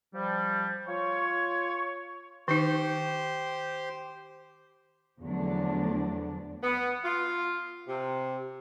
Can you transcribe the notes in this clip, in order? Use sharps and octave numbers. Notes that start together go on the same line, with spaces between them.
F3 G3
F4 C#5
D#3 D#4 G4 C5 C6
E2 D3 F3 F#3 A3 D4
B3
F4
C3